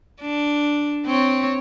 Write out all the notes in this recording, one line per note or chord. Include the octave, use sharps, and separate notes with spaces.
D4
C4 C#5